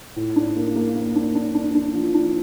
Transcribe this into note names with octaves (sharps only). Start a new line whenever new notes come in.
A2
D4
A#3
A#3
A#3
D4
D4
D4
D4
F3
D4